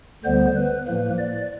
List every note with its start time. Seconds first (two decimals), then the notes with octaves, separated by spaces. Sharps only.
0.24 D2 D3 G3 B3 C5
0.56 B4
0.87 A2 F3 A#3 B4
1.18 D5